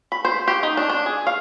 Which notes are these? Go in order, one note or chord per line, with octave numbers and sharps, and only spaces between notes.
B5
C5
G4
D#4
D4
D4
G#4
F5